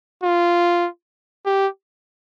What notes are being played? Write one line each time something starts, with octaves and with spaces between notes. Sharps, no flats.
F4
G4